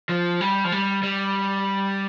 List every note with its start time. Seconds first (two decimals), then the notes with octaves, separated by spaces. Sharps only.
0.09 F3
0.41 G3
0.64 F3
0.72 G3
1.03 G3